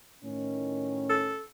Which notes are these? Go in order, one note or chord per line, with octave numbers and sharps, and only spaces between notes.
A2 D#3 C#4
A4